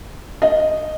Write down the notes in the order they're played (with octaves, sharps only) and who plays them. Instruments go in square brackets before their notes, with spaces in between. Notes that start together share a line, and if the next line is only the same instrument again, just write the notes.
[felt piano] D#5